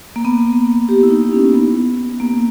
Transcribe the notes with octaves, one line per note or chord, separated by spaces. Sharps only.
A#3
B3
G4
E4
D#4
C#4
B3
A#3